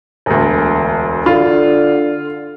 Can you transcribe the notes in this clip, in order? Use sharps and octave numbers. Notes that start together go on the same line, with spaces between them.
E1 D2
D3 F4